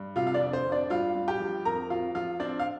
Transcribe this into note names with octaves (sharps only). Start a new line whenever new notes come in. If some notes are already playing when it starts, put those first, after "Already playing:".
Already playing: G2
C3 F4 F5
F5
D4 D5
F2
C5
F2
D4 D5
G2 F4 F5
G2
G4 G5
F3
F2 A#4 A#5
F2 F4 F5
F3 F4 F5
C4 D4 D5
F5